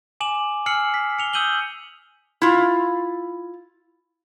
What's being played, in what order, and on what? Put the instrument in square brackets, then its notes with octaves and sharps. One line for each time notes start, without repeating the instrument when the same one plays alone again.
[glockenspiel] G#5 D6 E7 F#7
G#5 E6 F6 C7 C#7 F#7
B6
C#7 F7 G7
D#6 E6 G6 D#7 F#7 G7
[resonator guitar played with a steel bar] E4 F4